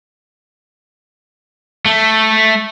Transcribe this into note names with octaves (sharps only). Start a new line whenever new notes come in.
A3